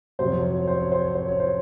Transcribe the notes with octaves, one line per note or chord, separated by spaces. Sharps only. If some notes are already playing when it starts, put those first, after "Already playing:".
F2 C3 F#3 C5
C#5
C5
C#5
C5
C#5
C5
C#5
C5
C#5
C5